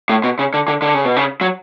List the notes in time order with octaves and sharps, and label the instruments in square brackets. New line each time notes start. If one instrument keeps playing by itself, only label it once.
[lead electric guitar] A2
B2
C#3
D3
D3
D3
C#3
B2
C#3
F#3